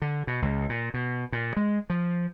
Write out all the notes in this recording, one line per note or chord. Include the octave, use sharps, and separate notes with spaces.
D3
B2
C#2
A#2
B2
A#2
G#3
F3